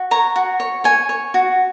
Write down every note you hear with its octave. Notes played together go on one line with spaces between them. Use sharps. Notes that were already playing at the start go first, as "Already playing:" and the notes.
Already playing: F#4
C#5 A#5
F#4
C#5
C#5 G#5
C#5
F#4